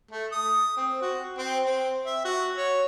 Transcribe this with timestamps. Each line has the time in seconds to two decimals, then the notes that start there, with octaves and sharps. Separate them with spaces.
0.12 A3
0.32 D#6
0.77 C4
1.02 F#4
1.38 C4
1.66 C4
2.06 E5
2.25 F#4
2.58 C#5